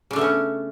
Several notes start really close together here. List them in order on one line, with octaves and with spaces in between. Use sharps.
C#3 D4 A3 B3 C#4